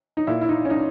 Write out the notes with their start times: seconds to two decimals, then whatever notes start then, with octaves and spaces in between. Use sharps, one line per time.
0.17 D#4
0.27 A#2 E4
0.42 E4
0.49 D#4
0.65 C#4
0.70 D#4